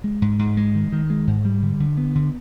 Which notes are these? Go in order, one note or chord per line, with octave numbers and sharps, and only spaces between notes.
G#3
G#2
G#2
G#3
D#3
D#3
G#3
G#2
G3
D3
D3
B3
D3